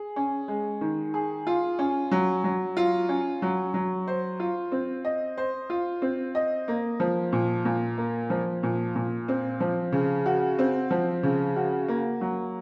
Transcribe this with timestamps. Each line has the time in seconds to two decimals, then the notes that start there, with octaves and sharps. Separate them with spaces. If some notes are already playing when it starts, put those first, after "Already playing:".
Already playing: G#4
0.16 C#4
0.48 G#3
0.81 D#3
1.14 G#4
1.47 F4
1.79 C#4
2.11 F#3
2.44 F#3
2.77 F4
3.09 C#4
3.42 F#3
3.74 F#3
4.07 C5
4.40 F4
4.72 C4
5.05 D#5
5.38 C5
5.70 F4
6.02 C4
6.35 D#5
6.68 A#3
7.00 F3
7.33 A#2
7.65 A#2
7.98 A#3
8.30 F3
8.63 A#2
8.96 A#2
9.28 C4
9.60 F3
9.92 C#3
10.26 F#4
10.59 C4
10.91 F3
11.23 C#3
11.56 F#4
11.88 A#3
12.21 F#3